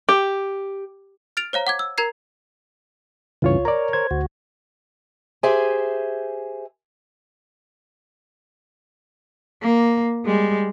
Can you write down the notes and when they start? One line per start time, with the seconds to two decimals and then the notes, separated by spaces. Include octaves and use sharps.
0.09 G4
1.37 F6 A6 D7 F7
1.53 C5 C#5 F5 A#5
1.67 F#5 D6 G#6
1.79 E6
1.98 A#4 A#5 G#6 C7
3.42 C#2 G2 C#3 E3 F4 C#5
3.65 A#4 C#5 D5 A#5
3.93 C5 G#6
4.11 D2 F#4
5.43 G4 G#4 C5 E5 G#5
9.62 A#3
10.26 G3 G#3